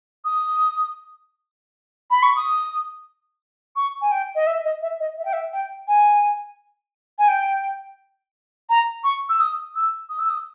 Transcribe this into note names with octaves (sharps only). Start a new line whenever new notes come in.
D#6
B5
C#6
D#6
C#6
G#5
G5
D#5
E5
D#5
E5
D#5
E5
G5
E5
G5
G#5
G#5
G5
A#5
C#6
E6
D#6
E6
D#6
E6
D#6